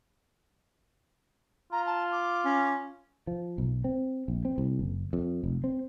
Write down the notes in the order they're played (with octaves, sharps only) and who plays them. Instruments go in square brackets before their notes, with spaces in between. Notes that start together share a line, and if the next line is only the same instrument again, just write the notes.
[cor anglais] F4 [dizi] A#5
[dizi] A5
D6
[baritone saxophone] C#4
[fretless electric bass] F3
B1
C4
A#1
C4
C2
F#1
F2
F1
C4